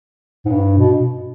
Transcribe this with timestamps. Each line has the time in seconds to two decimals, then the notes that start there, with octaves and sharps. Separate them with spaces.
0.45 G#2
0.51 G2
0.78 B2